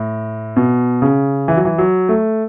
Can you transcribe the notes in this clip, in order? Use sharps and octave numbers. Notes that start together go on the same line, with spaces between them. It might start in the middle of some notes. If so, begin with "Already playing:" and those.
Already playing: A2
B2
C#3
E3
F#3
E3
F#3
A3